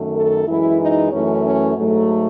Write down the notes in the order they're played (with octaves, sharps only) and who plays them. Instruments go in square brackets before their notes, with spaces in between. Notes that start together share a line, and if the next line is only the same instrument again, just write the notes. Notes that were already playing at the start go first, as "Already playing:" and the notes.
Already playing: [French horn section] F#2 D#3 A3
A4
F#2 E3 G#3 E4
D#4
F#2 E3 A3 C#4
C#4
G#2 F#3 A3